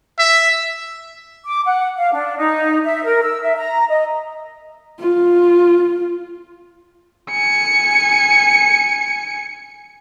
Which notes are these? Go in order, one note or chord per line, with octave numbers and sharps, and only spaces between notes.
E5
D6
F#5
F5
D4
D#4
E5
A#4
E6
E5
A#5
D#5
F4
G#5 C#7